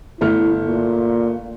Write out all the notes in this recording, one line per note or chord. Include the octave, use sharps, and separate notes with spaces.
G1 A3 E4 F6
A#2